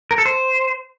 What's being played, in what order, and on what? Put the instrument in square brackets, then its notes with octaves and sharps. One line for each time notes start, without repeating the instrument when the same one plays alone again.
[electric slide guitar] A#4
A4
C5